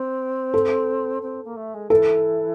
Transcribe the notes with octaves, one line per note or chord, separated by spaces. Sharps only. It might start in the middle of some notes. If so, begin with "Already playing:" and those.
Already playing: C4
A4
C4
A#3
A3
G#3
E3 A4